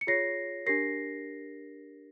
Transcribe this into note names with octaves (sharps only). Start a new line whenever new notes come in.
C#7
F4 G#4 C#5 A#6 C7
D4 G4 A#4 A#6 C7